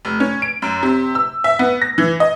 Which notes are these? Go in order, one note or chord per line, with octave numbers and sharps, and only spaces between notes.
F1
C#4
D7
F#2
C3
E6
E5
B3
A#6
E3
D#5